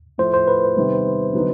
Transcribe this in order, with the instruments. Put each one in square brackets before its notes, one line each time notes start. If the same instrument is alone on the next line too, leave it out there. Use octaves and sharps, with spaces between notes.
[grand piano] A2 F3 A3 [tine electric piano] C5
[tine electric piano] C5
B4
[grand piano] C3 D#3 G3 B3
D3 F#3 B3 D#4